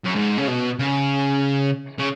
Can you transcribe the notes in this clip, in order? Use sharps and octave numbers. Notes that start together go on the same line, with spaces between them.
F#2
G#2
C#3
B2
C#3
C#3